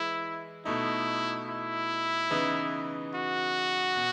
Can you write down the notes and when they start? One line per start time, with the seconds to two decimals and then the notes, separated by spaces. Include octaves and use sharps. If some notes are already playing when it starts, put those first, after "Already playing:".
Already playing: E3 G#3 E4
0.65 B2 A3 D#4 E4
1.48 E4
2.30 C#3 E3 B3 D#4
3.14 F#4
3.96 B2